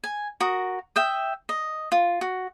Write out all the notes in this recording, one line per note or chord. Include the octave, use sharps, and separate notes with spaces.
G#5
F#4 A#4 D#6
E5 G5 D#6
D#5
F4
F#4